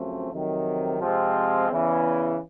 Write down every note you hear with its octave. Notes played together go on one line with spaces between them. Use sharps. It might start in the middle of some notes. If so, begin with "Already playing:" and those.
Already playing: F#2 C#3 F3 A3 C4
F2 C3 D#3 F#3
C3 F3 G#3 C4 F4
E2 C#3 E3